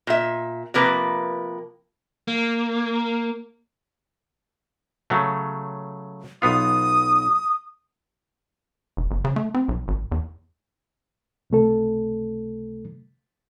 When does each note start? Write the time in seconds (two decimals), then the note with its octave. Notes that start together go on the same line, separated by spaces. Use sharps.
0.07 A#2 E5
0.74 C3 F3 A#3 B4
2.28 A#3
5.10 C#3 F#3 A3
6.42 B1 B3 F4 D#6
8.97 F1
9.11 G1
9.25 C#3
9.36 A3
9.54 C4
9.68 B1
9.88 G#1
10.11 E2
11.50 C#2 C3 A3 A4